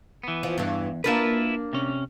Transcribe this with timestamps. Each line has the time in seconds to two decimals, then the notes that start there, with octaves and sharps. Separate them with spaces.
0.23 E3 B3
0.43 F3
0.58 E2 G2 E3
1.04 A#3 D4 E4 F4 A#4 B4
1.73 C3 C#4